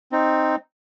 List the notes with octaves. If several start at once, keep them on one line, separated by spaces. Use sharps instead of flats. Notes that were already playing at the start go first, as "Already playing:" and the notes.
C4 D#4